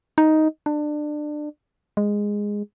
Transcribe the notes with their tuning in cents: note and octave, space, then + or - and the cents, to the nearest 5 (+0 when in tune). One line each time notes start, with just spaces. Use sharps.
D#4 +5
D4 +25
G#3 -10